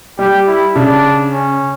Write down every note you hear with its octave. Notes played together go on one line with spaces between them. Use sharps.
G3 G4
E4
C#3 D4
C#4